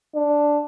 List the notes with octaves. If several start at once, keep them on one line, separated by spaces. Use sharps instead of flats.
D4